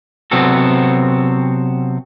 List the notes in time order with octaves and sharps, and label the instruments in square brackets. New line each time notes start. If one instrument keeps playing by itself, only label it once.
[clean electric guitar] C3 F#3 B3 C4 F#4 A4